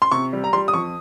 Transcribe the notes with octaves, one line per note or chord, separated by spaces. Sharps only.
C6
C3 C#6
G3
A#5
G3 C6
D#6
F2 C#6